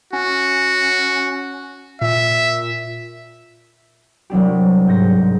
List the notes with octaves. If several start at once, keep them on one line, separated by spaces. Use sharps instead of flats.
C#4 F#4
A#2 E5
C2 F#3 D4 G4
G#2 G6 A#6
G#2